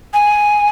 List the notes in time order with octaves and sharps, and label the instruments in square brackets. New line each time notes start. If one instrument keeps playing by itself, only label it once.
[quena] G#5